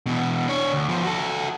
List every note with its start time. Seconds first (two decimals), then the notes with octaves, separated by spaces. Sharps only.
0.06 E2 B2
0.48 D4 C#5
0.72 D2
0.89 F3 B3
1.03 F#4 A4